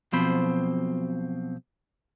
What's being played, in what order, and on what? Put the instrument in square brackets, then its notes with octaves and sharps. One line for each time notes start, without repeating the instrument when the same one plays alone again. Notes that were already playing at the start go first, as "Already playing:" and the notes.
[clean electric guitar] B1 B2 F3 C4 C5 B5